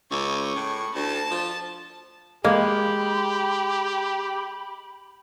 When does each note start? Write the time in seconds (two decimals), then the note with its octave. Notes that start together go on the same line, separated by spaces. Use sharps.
0.11 C#2 C#6
0.55 A2
0.95 D2 A5
1.31 F3
2.44 G#3 A#3 G4 B5